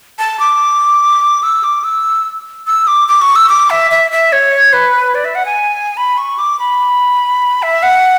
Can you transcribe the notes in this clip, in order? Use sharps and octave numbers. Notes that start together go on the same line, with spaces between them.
A5
D6
E6
D6
E6
E6
D6
D6
C#6
E6
D6
E5
E5
E5
C#5
B4
D5
E5
F#5
G#5
B5
C#6
D6
B5
E5
F#5